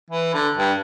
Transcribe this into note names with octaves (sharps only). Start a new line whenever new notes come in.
E3
D3
G2